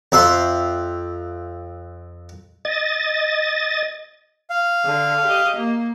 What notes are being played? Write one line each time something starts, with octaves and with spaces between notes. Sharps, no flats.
F2 E5 C6
D#5 A6
F5
D3
G4 D#5
A#3